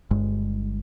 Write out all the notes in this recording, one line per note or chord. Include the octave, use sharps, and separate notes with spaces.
G1 G2 G#3